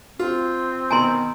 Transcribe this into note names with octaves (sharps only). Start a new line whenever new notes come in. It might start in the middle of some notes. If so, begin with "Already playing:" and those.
C4 F4
B2 D#3 G#5 A#5 C6